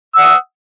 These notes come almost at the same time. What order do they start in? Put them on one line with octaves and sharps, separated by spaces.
E6 F#5 D#6